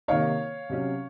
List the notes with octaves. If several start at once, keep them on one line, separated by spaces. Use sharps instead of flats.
C3 D#3 A#3 D#4 C#5 F5
C3 F#3 C#4